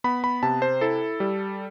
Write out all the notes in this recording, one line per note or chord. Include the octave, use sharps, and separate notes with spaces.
B3 B5
B5
C3 A5
C5
E4 A4
G3